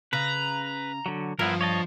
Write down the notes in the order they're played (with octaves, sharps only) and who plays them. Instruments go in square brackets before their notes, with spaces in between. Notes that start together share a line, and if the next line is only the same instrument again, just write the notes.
[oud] C#3 [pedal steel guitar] B4 [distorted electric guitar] A#5
[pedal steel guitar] D3 F#3
[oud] G2 [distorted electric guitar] F3 [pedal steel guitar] B3 E4 A#4
[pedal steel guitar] C#5 D#5 A5